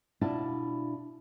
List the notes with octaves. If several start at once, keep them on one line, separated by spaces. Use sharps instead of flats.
B2 D4 E4 F4 A5